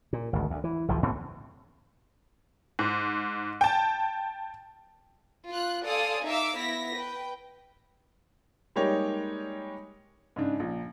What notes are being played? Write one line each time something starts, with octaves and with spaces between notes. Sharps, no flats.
A#2
G#1 D2
D2
E3
G#1 C#2 E3 F3
B1 A2 B3 C4
G#2
G5 A5
F4 F#6
A4 D5 F5 G#5 C6 D#6
D#4 E5 F5 D6 E6
B3 E4 A#6 B6
B4 G5
G3 G#3 A#3 D#4 G4 C#5
G#2 C#3 D4
A#1